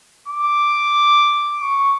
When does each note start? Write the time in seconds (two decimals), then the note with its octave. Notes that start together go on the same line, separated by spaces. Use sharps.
0.28 D6
1.61 C#6